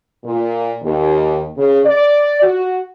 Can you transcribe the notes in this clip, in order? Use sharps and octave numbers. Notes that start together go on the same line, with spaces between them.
A#2
D#2
C#3
D5
F#4